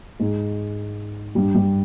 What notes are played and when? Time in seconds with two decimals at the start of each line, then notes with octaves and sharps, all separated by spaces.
0.20 G#2 G#3
1.35 G2 G3
1.55 G2 G3